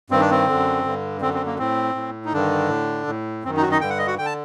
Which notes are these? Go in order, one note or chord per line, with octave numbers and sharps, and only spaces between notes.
G2 D#3 C4
D4
C4
F#2 D3
G2 D3
F#2 D3 C4
C4
A#3
A2 C4
A2
D#4
G2 D3 D#3 D4
A2
A2
F#2 D#3 C4
D#4
F#3 F#4
D#4 D#5
G2 D3 G5
F#5
D#5
F#4 F#5
D3 G5
A5